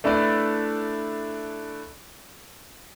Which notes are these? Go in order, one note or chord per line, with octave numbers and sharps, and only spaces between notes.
A3 D4 E4 B4 D5